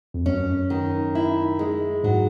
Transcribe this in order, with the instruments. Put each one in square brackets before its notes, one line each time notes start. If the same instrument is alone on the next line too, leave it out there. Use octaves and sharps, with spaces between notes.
[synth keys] F2
[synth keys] F#2 [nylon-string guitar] C#4
[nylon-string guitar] D#3
E4
G#3
[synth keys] G#2 [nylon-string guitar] F#3